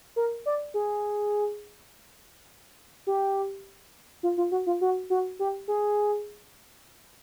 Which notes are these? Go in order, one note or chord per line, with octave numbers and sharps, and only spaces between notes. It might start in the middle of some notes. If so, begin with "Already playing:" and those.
A#4
D5
G#4
G4
F4
F4
F#4
F4
F#4
F#4
G4
G#4